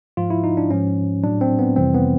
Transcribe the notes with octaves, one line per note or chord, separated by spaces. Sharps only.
G#2 F3 F4
E4
D#4
D4
G#2 F3 C#4
A2 F#3 D4
C4
B3
F2 C3 E3 G3 C4
B3